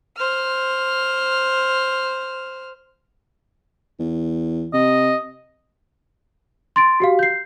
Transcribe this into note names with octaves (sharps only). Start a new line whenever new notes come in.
C5 F6
E2
C3 D#5
C6 A6 D7
F#4 G4 F5
G6 C7